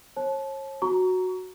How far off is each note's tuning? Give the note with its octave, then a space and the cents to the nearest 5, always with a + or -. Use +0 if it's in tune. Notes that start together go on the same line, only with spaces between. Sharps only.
C#5 -40 A5 -30
F#4 -5 A#5 +0 C#6 +30